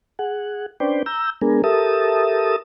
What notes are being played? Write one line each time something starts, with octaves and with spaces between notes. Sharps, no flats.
G#4 F#5
C#4 D4 B4 C5 D5 G5
A#5 E6 G6
G#3 B3 D4 G#4 A#4
G4 A4 A#4 E5 A5 D#6